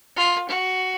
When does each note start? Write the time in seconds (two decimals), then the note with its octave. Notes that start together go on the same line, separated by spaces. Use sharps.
0.16 F4
0.49 F#4